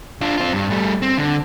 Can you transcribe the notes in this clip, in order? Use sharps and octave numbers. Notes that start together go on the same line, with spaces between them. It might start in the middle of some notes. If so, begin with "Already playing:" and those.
D4 F4
C4 F4
G2
G3 A3
C4
D3